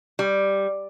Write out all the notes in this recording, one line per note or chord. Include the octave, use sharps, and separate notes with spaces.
G3